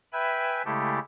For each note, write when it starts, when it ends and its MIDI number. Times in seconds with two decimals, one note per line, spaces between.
0.13 0.62 71
0.13 0.62 76
0.13 0.62 79
0.13 0.62 80
0.13 0.62 83
0.65 0.99 49
0.65 0.99 56
0.65 0.99 57
0.65 0.99 64
0.65 0.99 67
0.65 0.99 69